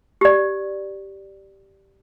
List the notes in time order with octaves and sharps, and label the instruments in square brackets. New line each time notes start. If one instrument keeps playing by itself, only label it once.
[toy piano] G4 D5